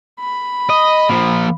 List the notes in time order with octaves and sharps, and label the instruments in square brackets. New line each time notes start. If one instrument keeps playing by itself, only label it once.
[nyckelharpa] B5
[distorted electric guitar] D#5
F3 A#3